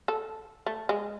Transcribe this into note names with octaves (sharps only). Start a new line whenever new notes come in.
A4
A3
G#3